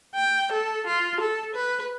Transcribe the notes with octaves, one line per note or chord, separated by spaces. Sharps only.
G5
A4
F4
A4
B4